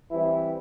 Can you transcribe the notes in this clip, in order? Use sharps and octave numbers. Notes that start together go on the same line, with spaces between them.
E3 G3 C4 E4